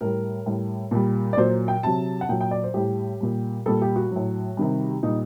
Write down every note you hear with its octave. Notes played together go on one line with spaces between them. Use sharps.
A2 G3 A#4
A2 G3
A#2 G3
D5
A#2 F#3 C5
G5
C3 F#3 A5
F#5
A#2 F#3 G5
G5
D5
C5
A2 G3 G4
A#2 G3
A#2 G3 A4
G4
F#4
A2 F#3
C3 D#3 G3
A#2 G3 D#4